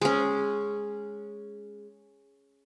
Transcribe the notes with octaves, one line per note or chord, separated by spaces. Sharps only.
G#3 C#4